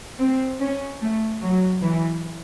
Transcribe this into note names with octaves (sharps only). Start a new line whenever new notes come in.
C4
C#4
A3
F#3
E3